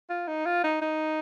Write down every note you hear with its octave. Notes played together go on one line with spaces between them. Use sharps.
F4
D#4
F4
D#4
D#4